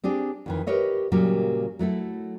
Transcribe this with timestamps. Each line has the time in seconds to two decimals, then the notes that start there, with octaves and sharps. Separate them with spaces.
0.04 C4 D4 G4 G#4
0.46 F2 D#3 E3
0.67 G4 A#4 B4 C#5 D#5 E5
1.12 A#2 C#3 F#3 G3 A#3 G4
1.79 F#3 A3 E4 A4